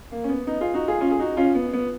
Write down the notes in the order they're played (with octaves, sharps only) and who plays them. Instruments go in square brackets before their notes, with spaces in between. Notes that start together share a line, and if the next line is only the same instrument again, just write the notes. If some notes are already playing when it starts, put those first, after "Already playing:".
[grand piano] A#3
C#4
B3
B3 D#4
F4 G#4
D#4 F#4
F4 G#4
C#4 F4
G#4
D#4 F#4
C#4 F4
B3
B3